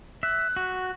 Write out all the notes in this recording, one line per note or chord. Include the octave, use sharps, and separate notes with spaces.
E5 F#6
F#4